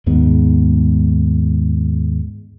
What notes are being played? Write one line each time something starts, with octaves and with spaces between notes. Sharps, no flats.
D#2 G#2 G#3 B3